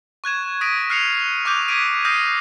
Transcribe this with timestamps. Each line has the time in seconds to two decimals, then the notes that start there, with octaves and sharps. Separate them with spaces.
0.24 C#6 F#6 G#6 E7
0.61 D#6 A#6 B6 D7 D#7
0.90 F6 F#6 C7 C#7 D#7 F7
1.45 C#6 D6 F#6 G6 F7
1.68 D#6 G#6 B6 D7 D#7
2.05 D#6 F6 G6 A#6 C7